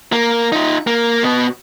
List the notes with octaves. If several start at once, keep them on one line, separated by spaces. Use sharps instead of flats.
A#3
D#4 F4
A#3
B2 B3